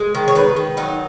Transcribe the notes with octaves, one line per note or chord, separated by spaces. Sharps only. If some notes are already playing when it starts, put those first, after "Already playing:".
Already playing: G#3
D#3
C#5
D#3 B4
D#3
F#3 D#4